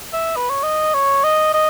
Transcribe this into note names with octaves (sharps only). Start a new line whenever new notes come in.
E5
B4
C#5
D#5
C#5
D#5
D#5